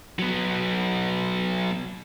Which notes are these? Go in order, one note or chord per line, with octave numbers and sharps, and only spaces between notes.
F#3 B3